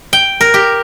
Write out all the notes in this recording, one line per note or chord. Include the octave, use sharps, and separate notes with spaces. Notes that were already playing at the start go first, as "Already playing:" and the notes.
G5
A#4
G4